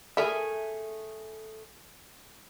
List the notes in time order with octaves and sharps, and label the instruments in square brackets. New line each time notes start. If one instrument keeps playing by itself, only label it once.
[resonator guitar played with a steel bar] A3 G#4 [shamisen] A#4 E5